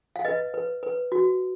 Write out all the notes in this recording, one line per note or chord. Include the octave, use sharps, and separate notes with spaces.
F5
B4 D#5
B4
B4
F#4